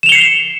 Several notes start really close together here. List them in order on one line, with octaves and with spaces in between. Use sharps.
E7 F7 G7 C#7 C7